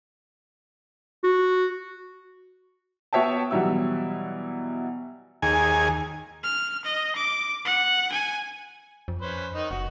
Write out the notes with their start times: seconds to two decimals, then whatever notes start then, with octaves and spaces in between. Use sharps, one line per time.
1.24 F#4
3.13 B3 F#4 C#5 E5 G5 A5
3.51 B2 E3 F#3 G3 E4 E6
5.42 D#2 G#4 G#5
6.43 F6
6.85 D#5
7.16 D6
7.65 F#5
8.12 G#5
9.08 F2
9.22 C#4 B4 C5
9.54 D#3 D#4
9.71 F1 F#4